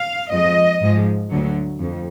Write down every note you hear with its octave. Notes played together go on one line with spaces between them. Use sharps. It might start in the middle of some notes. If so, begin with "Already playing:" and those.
Already playing: F5
F2 F3 G#3 D#5
G#2 F3 G#3
D2 D3 F#3
F2